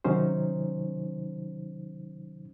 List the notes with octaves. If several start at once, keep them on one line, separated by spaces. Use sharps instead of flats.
C3 D#3 F#3 C#4 D#4 C5